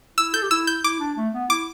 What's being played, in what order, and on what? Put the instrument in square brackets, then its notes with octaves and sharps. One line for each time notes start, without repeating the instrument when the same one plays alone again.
[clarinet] E4 [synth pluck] E6
[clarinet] A4 [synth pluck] G6
[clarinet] G4
[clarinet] E4 [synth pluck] E6
[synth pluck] G6
[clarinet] E4 [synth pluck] D6
[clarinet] D4
A3
B3
[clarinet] E4 [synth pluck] D6